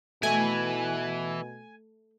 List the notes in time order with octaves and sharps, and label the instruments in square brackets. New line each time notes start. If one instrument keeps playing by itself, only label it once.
[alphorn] B2 [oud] A3 [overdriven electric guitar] E4 B4 [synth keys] G#5